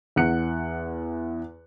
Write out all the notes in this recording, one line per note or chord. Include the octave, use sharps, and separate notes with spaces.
E2 F#5 F#6 C#7